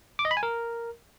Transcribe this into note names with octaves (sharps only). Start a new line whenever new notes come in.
D6
D#5
B5
G#5
A#4